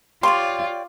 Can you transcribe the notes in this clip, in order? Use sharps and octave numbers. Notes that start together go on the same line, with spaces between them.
F4 G4 C#5 D5 C6